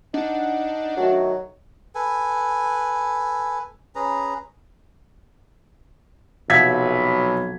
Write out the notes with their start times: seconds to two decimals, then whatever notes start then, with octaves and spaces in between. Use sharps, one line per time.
0.14 D4 D#4 F#5
0.97 D#3 F#3 A3 F#4
1.95 A4 B4 G#5
3.95 C#4 G#4 B4 A#5
6.50 B1 C3 F3 F#3 G#6 B6